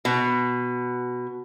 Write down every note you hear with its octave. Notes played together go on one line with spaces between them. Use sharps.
B2